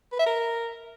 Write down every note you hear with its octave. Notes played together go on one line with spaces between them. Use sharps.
B4
E5
A#4